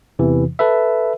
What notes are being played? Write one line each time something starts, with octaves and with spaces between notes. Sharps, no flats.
E2 C3 E3
A4 B4 E5